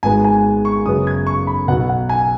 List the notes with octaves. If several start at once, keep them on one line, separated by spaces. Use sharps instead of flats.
G#1 G#2 G#3 B3 G#5
G#5
C#6
F#2 C#3 B3 D#6
G#6
C#6
B5
B1 B2 B3 F#5
F#5
G#5